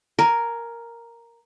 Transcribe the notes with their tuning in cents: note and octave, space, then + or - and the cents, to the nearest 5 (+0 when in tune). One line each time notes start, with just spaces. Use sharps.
A#4 +0 G#5 +15